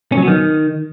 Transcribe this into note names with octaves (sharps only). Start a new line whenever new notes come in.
C#4
F#3
B3
D#3